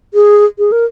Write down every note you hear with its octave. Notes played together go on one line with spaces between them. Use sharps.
G#4
G#4
A#4